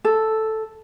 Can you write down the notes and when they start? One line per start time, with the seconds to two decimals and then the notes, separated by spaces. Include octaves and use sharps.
0.05 A4